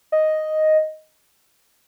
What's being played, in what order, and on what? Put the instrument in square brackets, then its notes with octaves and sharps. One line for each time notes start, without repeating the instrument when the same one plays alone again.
[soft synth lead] D#5